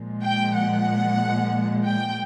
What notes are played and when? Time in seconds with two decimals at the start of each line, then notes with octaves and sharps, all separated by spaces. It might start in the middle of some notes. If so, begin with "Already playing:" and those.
Already playing: A#2 F3 G#3
0.22 G5
0.55 F#5
1.84 G5